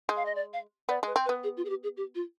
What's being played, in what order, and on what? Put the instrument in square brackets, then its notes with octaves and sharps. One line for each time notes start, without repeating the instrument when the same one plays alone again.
[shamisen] G#3
[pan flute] F5
D#5
D5
F5
[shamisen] B3 [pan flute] D5
[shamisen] G#3 [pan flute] B4
[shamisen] C4
[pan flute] B4
[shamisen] B3
[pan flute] G#4
F4
G#4
G4
G#4
G4
F4